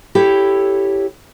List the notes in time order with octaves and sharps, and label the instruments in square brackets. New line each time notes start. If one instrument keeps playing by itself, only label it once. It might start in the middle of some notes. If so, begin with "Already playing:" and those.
[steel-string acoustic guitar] E4 G4 A4 C#5